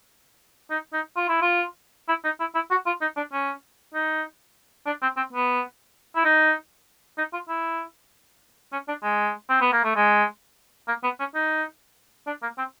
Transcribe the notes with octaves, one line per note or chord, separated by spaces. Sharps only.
D#4
D#4
F4
E4
F4
E4
D#4
E4
E4
F#4
F4
D#4
D4
C#4
D#4
D4
C4
C4
B3
E4
D#4
D#4
F4
E4
C#4
D4
G#3
C4
B3
A#3
A3
G#3
A#3
B3
C#4
D#4
D4
A#3
C4